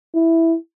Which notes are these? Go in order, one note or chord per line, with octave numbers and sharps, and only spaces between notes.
E4